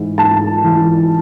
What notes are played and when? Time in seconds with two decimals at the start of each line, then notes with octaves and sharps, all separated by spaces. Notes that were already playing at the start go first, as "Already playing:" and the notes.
Already playing: G#2 E3
0.18 G#2 A5
0.64 E3